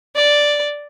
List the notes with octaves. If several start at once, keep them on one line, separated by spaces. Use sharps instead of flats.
D5